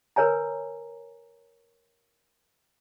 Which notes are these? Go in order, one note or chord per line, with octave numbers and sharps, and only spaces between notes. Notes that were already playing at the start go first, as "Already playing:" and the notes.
A#4 B4 C#5 G#5 A#5